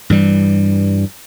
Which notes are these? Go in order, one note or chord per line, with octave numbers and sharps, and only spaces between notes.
G2 E3 G3